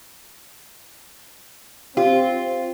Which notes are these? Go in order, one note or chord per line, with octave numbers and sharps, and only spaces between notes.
C4 F4 G4